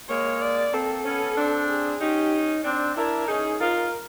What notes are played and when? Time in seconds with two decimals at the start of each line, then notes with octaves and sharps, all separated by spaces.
0.10 G#3 A#3 C#5
0.42 D5
0.74 A#3 C4 A4
1.05 B3 C#4
1.37 C4 D4
1.69 G#4
2.01 C#4 D#4 G4
2.64 C4 D4
2.97 D4 E4 A#4
3.28 C#4 D#4 G#4
3.60 D#4 F4 A#4